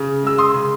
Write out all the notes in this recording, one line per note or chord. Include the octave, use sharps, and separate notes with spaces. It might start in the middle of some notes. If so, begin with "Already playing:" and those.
Already playing: C#3
G#3 E6
C6 D#6
C#3